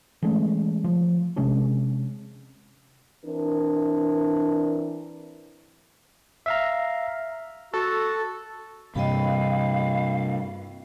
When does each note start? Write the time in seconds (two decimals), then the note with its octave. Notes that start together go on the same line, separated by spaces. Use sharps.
0.23 E3 G#3 A3 C#4
0.84 F3
1.36 C3 G#3 C#4 D4
3.25 E3 C4 D4 A#4
6.46 E5 F5 A#5
7.73 F#4 A4
8.96 G2 C3 D#5 F5 G5 B5